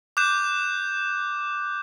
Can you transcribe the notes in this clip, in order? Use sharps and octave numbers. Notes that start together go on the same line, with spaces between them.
D6 F#6 G6 E7